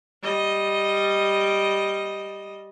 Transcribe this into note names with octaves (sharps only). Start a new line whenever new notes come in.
G3 D#5